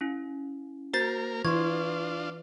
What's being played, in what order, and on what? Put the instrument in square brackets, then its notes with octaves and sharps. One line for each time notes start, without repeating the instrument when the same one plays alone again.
[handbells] C#4 E4
[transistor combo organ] A#3 A#4 [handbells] F#4 [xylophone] C5 A6
[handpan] E3 [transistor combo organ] D4 F4 [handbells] C6 C#6 [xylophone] G#6